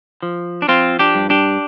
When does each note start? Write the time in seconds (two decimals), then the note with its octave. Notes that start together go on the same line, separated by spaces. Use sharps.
0.23 F3
0.62 D4
0.68 F3 C4 F4
0.99 D4 G4
1.15 G2
1.30 D4 G4